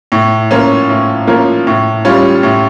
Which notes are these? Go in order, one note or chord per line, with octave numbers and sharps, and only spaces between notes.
A2
F3 A#3 C#4 F4
A2
F3 A#3 C#4 F4
A2
G3 C#4 F4
A2